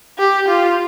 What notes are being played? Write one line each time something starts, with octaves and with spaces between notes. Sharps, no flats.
G4
F4